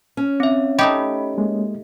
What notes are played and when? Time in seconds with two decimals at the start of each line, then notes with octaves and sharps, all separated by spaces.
0.17 C#4
0.40 C4 E5
0.79 A3 D#4 G4 D#5 B5
1.38 G#3 A#3